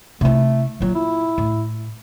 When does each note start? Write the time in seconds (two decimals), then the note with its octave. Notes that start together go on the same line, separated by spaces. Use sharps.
0.21 C3 A3 E4
0.80 A#2 F#3 F4
0.94 E4
1.38 A2